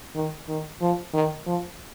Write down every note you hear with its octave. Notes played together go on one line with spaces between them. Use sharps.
D#3
D#3
F3
D#3
F3